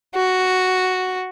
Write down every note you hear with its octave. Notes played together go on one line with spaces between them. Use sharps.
F#4